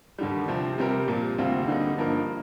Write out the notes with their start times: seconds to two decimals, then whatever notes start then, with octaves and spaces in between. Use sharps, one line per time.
0.18 D#2 D3 G3
0.48 C3 F3 C4
0.78 C3 G3 C4 G4 A#4
1.08 A#2 F3 A#3
1.38 D2 C3 G3 C4 F4
1.68 D3 G3 A#3 D#4
1.98 G2 F3 A#3 D#4 A#4